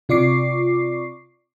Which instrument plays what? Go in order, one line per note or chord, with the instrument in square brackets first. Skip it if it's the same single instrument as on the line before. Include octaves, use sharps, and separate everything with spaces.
[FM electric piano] C3 F4 D5 C#6 D6 C7